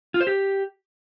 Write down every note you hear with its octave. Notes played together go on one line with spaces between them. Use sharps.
F4
C5
G4